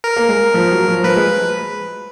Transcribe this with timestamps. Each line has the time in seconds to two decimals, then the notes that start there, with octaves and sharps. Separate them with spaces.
0.04 A#4
0.16 A#3
0.29 G#3
0.54 F3
0.71 F#3
0.88 F3
1.04 F3 B4
1.16 G#3